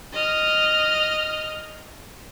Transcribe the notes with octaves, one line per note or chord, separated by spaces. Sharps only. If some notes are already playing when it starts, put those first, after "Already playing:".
D#5 F6